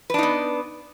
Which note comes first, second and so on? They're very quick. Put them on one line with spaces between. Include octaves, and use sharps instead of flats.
B4 D4 D#4 B3